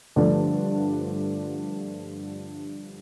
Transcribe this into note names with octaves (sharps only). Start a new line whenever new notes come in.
G2 D3 F3 A3 D4